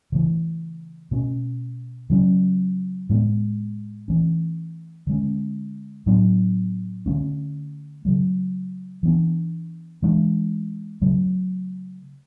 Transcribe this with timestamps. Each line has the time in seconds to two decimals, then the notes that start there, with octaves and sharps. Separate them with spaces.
0.12 C#3 E3 A3
1.11 B2 A3 C#4
2.10 C#3 F#3 C#4
3.09 A2 G#3 B3
4.08 E3 A3 C#4
5.07 D3 G#3 C#4
6.06 A2 F#3 B3 D4
7.06 D3 A3 C#4
8.05 C#3 F#3 A3
9.03 E3 B3 D4
10.02 E3 G#3 D4
11.01 C#3 F#3 A3